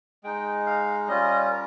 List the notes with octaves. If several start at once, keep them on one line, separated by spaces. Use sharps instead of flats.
G#3 D#4 G5
F5
G3 C#4 F4 D#5
A#4